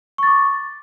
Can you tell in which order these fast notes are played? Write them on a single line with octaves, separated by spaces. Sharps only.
C#6 A6 D6